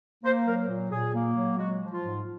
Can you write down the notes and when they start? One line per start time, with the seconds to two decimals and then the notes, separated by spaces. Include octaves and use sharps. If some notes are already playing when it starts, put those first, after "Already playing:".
0.24 A#3 C5
0.47 F#3 A#4
0.69 A#2
0.91 A#2 G#4
1.14 A#3
1.36 F#3
1.58 G#3 F#4
1.81 F3
1.92 F4
2.03 G#2